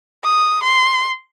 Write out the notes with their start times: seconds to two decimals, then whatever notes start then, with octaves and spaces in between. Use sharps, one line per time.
0.24 D#6
0.63 C6